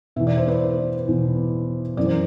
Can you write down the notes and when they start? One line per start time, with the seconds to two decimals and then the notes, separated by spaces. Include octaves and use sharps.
0.16 E2 B2 E5
0.27 D5
0.37 C5
0.48 B4 D5
1.07 E2 B2
1.97 F#2 E3 D5
2.05 C5